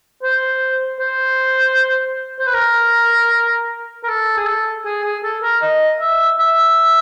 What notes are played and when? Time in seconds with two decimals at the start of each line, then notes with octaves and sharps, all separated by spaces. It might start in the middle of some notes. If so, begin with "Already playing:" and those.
0.23 C5
0.99 C5
2.39 C5
2.47 B4
2.54 A#4
4.04 A#4
4.08 A4
4.37 G#4
4.47 A4
4.85 G#4
5.04 G#4
5.23 A4
5.43 A#4
5.62 D#5
6.00 E5
6.39 E5